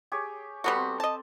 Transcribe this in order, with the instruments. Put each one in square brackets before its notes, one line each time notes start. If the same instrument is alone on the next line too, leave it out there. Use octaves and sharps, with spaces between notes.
[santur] G4 G#4 C#5
[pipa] G3 B3 F#4 [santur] A4 B4
[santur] C4
[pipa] D#5 A5